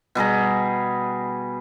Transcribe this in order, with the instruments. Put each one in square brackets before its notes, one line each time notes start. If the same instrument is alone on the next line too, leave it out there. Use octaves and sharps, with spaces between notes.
[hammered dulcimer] B2 G3 G#4 A#5